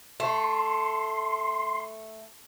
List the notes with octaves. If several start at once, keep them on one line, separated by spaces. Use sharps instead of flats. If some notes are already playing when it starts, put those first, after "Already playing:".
A3 C6